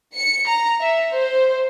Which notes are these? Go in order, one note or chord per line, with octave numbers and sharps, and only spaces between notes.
C#7
A#5
E5
C5